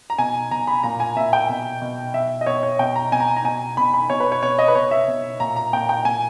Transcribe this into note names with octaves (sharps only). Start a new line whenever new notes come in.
A#5
B2 G#5
B2 A#5
B5
A#2 A#5
G#5
A#2 E5
G5
B2
B2
B2 E5
D#5
B2 C#5
C#5
B2 G5
A#5
B2 G#5
A#5
A#5
B2 G#5
B2 B5
B5
B2 C#5
B4
C#5
B2 C#5
D#5
B4
B2 C#5
E5
B2
A#2 A#5
A#5
A#2 G5
G5
A#2 G#5